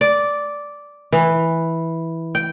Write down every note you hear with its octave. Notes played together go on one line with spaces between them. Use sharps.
D5
E3
G5